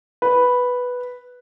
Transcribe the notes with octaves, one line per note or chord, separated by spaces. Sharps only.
B4